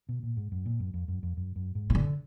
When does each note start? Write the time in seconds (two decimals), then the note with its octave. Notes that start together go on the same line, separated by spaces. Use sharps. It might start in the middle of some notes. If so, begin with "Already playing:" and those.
0.09 B2
0.23 A#2
0.37 G#2
0.52 F#2
0.66 A#2
0.80 F#2
0.94 F2
1.08 F#2
1.23 F2
1.37 F#2
1.56 F#2
1.75 G#2
1.90 B2
1.94 F#2 D3